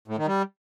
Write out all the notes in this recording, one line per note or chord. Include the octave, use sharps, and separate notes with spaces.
A2
D#3
G3